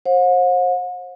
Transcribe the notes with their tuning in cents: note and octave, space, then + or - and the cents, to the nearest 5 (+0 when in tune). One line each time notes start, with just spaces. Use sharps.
C5 +35 F#5 -45